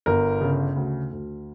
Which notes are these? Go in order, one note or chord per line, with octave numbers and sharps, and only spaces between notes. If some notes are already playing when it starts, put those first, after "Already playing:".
G1 A#4
C#3
D2
D2